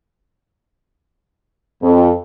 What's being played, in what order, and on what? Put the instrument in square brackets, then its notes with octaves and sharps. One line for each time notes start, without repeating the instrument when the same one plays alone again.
[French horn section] F2